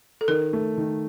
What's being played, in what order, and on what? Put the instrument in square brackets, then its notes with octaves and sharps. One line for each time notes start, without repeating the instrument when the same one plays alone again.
[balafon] A4
[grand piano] D#3 [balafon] A#4
[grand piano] A3
D#3